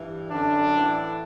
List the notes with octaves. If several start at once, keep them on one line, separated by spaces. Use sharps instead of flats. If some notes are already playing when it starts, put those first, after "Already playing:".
Already playing: G2 E3
F#2 D3 F#3 D4
A2 E3